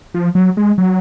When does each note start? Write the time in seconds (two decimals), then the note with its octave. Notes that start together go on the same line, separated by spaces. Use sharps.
0.14 F3
0.35 F#3
0.57 G#3
0.78 F#3